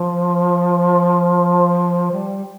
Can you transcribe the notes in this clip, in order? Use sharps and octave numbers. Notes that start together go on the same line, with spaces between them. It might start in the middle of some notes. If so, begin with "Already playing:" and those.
Already playing: F3
G3